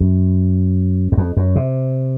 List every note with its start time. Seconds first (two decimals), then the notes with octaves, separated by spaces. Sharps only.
0.01 F#2
1.12 F#2
1.17 F2
1.37 F#2
1.56 C3